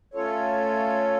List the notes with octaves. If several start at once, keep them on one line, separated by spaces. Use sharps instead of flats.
A3 C#4 F4 A4 C#5